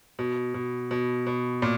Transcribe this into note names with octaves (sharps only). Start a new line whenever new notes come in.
B2
B2
B2
B2
A#2